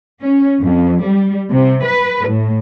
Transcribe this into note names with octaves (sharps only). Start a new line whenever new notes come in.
C#4
F2
G3
C3
B4
A2